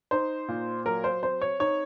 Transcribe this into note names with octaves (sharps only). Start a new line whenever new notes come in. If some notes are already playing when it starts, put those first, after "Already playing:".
D#4 C5
A#2
F#3 A#4
C5
C4 C5
C#5
D#4 C#5